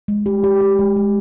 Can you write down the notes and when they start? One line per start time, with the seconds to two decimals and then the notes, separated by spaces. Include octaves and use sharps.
0.08 G#3
0.26 G4
0.44 G4
0.61 G4
0.79 G#3
0.97 G#3